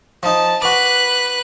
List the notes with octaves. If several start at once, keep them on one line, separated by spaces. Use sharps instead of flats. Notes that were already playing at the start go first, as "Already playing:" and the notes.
F3 D#4 A5
F#4 B4 D6 F#6